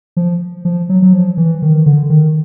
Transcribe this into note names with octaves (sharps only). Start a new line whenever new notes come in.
F3
F3
F#3
F#3
F3
E3
D#3
D3
D#3